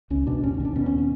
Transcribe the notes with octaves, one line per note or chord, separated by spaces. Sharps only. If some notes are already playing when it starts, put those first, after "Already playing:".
C#2 C#4
B2 D4
D#2 C#4
C#4
D#2 D4
B2 C#4
C#4
C#4